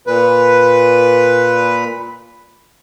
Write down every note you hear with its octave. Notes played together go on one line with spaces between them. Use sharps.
A#2 B4